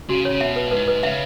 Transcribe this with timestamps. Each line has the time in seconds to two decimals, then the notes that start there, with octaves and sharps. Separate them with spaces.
0.09 C#3 F#4
0.25 C#3 C#5
0.41 B2 E5
0.56 B4
0.67 A#2
0.71 G#2 B4
0.88 B4
1.03 C#3 E5